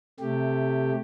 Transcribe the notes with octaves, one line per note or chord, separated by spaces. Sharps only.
C3 A3 G4